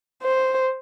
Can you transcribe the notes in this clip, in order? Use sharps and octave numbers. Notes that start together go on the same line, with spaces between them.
C5